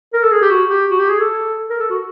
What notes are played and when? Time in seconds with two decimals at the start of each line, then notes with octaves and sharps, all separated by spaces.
0.13 A#4
0.23 A4
0.32 G#4
0.42 G4
0.50 F#4
0.70 G4
0.90 F#4
0.99 G4
1.09 G#4
1.20 A4
1.70 A#4
1.80 A4
1.90 F#4